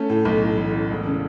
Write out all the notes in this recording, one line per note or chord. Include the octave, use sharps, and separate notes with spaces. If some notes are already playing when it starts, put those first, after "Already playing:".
Already playing: A3 C#4
A2
B1
A2
A1
A2
E1
C#3